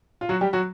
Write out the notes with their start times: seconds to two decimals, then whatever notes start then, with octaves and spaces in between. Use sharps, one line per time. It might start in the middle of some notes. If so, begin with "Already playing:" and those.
0.21 F4
0.29 F#3 F#4
0.41 G3 G4
0.53 F#3 F#4